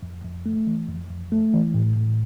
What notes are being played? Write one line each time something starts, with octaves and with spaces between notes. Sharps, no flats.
F2
F2
A3
E3
F2
F2
A3
E3
A2
A2